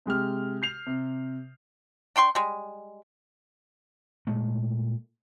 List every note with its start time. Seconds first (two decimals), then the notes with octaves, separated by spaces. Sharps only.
0.06 C3 G#3 G4 F6
0.62 G6 C7 F7
0.86 C3
2.16 D4 G5 C6 C#6
2.35 G3 G#3
4.27 A#2 G#3 A3